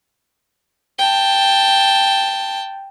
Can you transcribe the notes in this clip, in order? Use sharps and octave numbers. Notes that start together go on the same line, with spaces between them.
G5 A5